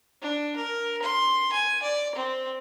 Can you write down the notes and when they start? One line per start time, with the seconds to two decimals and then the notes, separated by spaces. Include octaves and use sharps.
0.22 D4
0.56 A#4
1.02 C6
1.53 G#5
1.82 D5
2.15 C4